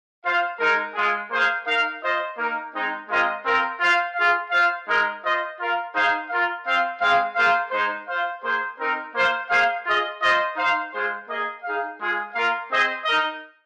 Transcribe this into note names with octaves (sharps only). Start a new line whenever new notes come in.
F4 C5 F5
G#3 D#4 A#4
G#3 F4 G#4
A#3 G#4 C5 F5
D#4 A#4 F5
F4 C5 D#5
A#3 D#4 A#4
G#3 C4 D#4
G#3 C4 F4 A#4 D#5
C4 F4 A#4
F4 C5 F5
F4 G#4 F5
F4 C5 F5
G#3 D#4 A#4 D#5
F4 C5 D#5
F4 A#4 F5
D#4 G#4 C5 F5
F4 A#4 F5
C4 F4 C5 F5
G#3 C4 G#4 F5
A#3 F4 G#4 C5 F5
G#3 D#4 C5
F4 C5 F5
A#3 G#4 C5
C4 D#4 A#4
A#3 F4 C5 F5
A#3 G#4 C5 F5
F4 G#4 D#5
F4 C5 D#5
D#4 C5 F5
G#3 F4 G#4 C5
A#3 G#4 D#5
D#4 G#4 F5
G#3 F4 G#4
A#3 F4 A#4 F5
C4 G#4 C5 D#5
D#4 A#4 D#5